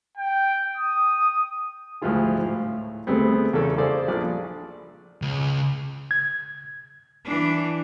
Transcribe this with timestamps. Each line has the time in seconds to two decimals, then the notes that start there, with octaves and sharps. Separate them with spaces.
0.17 G5
0.77 D#6
2.02 D2 G#2 F3 E4 F4 G#4
2.39 A2 F5
3.07 D2 G#3 A3 B3 C4
3.53 E2 C#3 A4
3.77 G#4 A4 C5 D5 F5
4.08 A#1 D4 G#4 D5
5.22 C#2
6.11 G#6
7.25 E3 D4